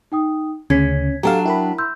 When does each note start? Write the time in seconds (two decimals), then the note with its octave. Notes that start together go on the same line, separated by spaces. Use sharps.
0.12 D#4 G5 D#6
0.70 D2 C#3 C#4 G#6 B6
1.23 F#3 D4 G4 A4 F5 A5 A#5
1.46 E4 A#4 G5 B5
1.78 C6 E6 G6